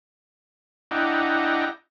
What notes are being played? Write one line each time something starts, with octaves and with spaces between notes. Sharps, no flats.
D4 E4 D#5 F#5 G5 A#5